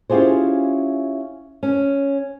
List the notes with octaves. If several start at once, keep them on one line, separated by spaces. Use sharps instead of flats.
C#4 E4 F4 G4 G#4 C5
C#4